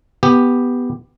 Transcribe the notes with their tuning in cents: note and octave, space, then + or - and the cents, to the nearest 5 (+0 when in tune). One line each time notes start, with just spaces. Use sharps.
B3 +0 G4 +5